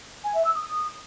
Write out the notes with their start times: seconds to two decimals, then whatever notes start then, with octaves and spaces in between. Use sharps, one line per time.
0.24 G#5
0.34 E5
0.45 E6
0.55 D#6